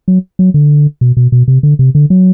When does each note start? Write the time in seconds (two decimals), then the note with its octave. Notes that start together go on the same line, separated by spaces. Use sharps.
0.08 F#3
0.39 F#3
0.54 D3
1.01 B2
1.17 B2
1.32 B2
1.48 C3
1.63 D3
1.79 C3
1.95 D3
2.10 F#3